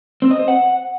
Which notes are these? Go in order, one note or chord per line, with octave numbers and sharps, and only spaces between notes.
C4
D#5
C5
F#5